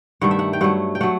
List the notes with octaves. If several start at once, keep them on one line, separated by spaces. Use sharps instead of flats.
G2 D#3 A3 F#5
E5
F#5
G5
G2 F#3 A3 F#5
G5
F#3 A3 F#5